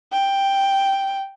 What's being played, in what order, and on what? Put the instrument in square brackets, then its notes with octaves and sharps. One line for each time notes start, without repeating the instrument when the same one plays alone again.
[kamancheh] G5